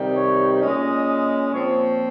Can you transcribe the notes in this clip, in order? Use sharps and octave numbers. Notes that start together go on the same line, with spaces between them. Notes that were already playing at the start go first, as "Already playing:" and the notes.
Already playing: C3 D#3 G3
C#5
A#2 G#3 C#4 D#5
A#2 F3 C4 C#5